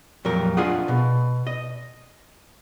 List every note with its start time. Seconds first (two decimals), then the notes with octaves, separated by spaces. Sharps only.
0.25 F2 A#2 F#3 G3 A#4
0.57 D4 F4 G#4 D#5 F#5
0.88 B2
1.47 D#5